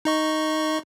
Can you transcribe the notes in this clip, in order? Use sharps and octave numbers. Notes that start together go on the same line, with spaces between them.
D#4 D#5 C#6